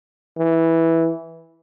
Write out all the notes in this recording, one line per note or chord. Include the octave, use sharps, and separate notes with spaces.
E3